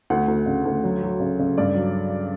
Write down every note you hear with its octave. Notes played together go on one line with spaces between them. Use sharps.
D2 F#5
D2
C#3
D2
F#3
F#3
C#3
C#3
G2 D5
F#3